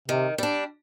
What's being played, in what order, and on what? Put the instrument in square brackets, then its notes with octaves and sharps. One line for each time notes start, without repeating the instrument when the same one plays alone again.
[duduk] C3 [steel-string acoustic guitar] D#3
[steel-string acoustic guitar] G3 D4